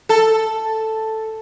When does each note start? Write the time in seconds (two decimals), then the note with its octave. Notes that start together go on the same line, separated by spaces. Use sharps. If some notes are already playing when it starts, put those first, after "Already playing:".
0.09 A4